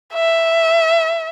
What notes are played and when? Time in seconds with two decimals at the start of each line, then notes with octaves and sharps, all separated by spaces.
0.14 E5